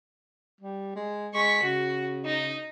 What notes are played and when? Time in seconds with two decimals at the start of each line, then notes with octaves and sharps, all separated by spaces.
0.61 G3
0.96 G#3
1.34 G#3 C#6 B6
1.63 C#3 F#4
2.25 D#4